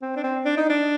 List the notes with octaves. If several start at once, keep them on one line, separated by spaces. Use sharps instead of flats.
C4
D4
C4
D4
D#4
D4